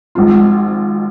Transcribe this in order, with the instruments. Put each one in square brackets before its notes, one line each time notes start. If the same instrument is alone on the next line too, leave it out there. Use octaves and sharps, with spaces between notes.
[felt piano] G#1 G#2 F3 C4 F4